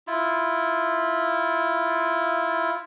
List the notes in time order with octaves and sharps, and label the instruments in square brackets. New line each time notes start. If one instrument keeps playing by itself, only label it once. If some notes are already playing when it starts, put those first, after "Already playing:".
[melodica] E4 F4